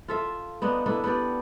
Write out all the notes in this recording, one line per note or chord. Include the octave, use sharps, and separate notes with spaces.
F4 A4 E5
B3 D4 D#4
B3 D4 E4 A4
B3 G4 D5